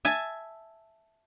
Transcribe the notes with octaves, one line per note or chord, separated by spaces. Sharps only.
E5 G#5 A5